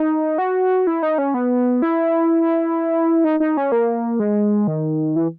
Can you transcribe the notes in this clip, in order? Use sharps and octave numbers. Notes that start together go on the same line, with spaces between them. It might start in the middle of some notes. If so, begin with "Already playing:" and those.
Already playing: D#4
F#4
E4
D#4
C#4
B3
E4
D#4
D#4
C#4
A#3
G#3
D#3
E3